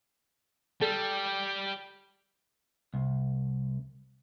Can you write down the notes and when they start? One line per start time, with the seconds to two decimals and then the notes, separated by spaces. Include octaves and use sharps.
0.81 G3 A4
2.94 C2